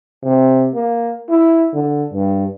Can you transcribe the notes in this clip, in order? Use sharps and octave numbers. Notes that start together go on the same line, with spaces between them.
C3
A#3
E4
D3
G2